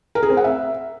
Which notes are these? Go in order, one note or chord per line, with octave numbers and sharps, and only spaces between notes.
A#4
G#4
C4
F#5
E5